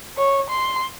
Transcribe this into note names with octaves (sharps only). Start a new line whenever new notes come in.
C#5
C6